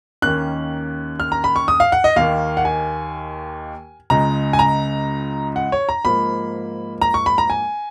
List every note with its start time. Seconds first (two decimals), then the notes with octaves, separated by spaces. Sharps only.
0.22 D#2 D#3 A#3 C#4 F#6
1.20 F6
1.32 A#5
1.44 B5
1.56 C#6
1.68 D#6
1.80 F5
1.92 F#5
2.04 D#5
2.16 D#2 D#3 A#3 F5
2.57 F#5
2.65 G#5
4.10 C#2 C#3 G#3 A#5
4.53 G#5
4.59 A#5
5.56 F#5
5.72 C#5
5.89 A#5
6.05 G#2 F3 A#3 B5
7.02 A#5
7.14 C#6
7.26 B5
7.38 A#5
7.50 G#5